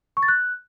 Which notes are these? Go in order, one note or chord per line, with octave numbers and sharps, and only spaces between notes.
C#6
A6
F#6